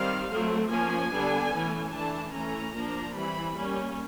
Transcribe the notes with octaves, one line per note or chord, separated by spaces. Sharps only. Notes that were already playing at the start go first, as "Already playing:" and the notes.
Already playing: D#3 G3 C4 F5
F#3 A3 C4
F3 A#3 C#4 G#5
D3 G3 B3 D4
E3 A3 C#4
E3 A3 D4 A5
E3 A3 C#4 A#5
F3 A#3 D4
E3 G3 C4 B5
G3 A#3 C#4